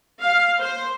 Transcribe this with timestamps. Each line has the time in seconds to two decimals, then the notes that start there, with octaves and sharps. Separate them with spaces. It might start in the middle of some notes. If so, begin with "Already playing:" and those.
0.21 F5
0.60 C5